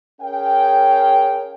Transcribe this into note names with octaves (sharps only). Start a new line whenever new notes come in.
C#4 G#4 A#4 F5 G5